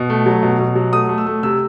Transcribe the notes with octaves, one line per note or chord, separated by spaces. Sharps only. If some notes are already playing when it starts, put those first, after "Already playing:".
Already playing: B2
A3
F#3
B2
B2
F#3
A3 D#6
A3
E6
A3
C3 E6